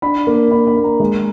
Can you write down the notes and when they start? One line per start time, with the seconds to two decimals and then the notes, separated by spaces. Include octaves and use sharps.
0.02 D4 B5
0.27 A#3
0.51 D4 B5
0.67 B5
0.76 A#3
0.84 A#5
1.00 G#3